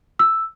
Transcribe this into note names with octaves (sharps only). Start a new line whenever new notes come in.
E6